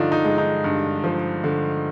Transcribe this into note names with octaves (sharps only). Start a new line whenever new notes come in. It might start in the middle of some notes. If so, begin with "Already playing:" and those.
Already playing: G2 D3 F3 D4 D#4 F4
D#4
G#3
D#4
G2
F3
D3